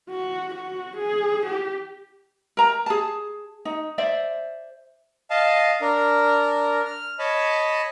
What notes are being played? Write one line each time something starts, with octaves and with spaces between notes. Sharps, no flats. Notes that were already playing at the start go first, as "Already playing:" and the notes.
F#4
F#4
G#4
G4
A#4 A#5
G#4 A5
D#4
C5 D5 E5
D#5 F5 A5
D4 A#4
F6
C#5 D#5 A5 B5